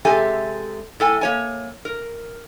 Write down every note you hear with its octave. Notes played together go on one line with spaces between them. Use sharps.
C3 G#3 G4 A4 E5 G#5
A2 A4 G#5
A#3 C#5 G#5
A#4